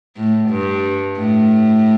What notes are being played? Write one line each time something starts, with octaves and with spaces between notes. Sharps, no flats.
A2
G2
A2